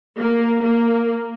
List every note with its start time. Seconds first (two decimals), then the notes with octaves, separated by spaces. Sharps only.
0.19 A#3
0.63 A#3